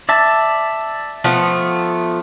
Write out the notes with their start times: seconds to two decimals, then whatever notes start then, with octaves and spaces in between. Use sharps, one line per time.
0.09 D5 E5 A5
1.24 F3 A3 B3